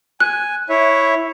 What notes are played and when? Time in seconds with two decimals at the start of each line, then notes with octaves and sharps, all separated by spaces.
0.20 G#5 F#6
0.69 E4 C#5 E5